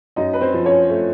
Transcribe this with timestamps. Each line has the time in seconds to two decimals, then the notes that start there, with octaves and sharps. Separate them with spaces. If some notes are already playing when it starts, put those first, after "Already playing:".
0.16 F#2 D#4 D#5
0.34 B4
0.41 C4 C5
0.54 F3
0.65 C#4 C#5
0.90 A3